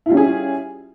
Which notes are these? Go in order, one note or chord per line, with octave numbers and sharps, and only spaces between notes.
G3 C#4 E4 F4 G#4